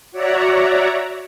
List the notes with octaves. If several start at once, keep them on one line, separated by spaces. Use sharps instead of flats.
F#4 C#5 D5 E5 F#5 A#5